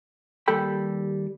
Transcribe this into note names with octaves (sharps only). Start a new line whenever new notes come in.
D#2 G3 A4 G5 B5